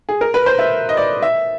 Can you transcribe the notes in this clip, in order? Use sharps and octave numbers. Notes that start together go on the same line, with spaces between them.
G#4
A#4
B4
C5
E5
D#5
D5
E5